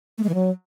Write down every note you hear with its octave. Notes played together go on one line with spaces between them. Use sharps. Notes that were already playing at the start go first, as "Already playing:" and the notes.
A3
G#3
E3
F#3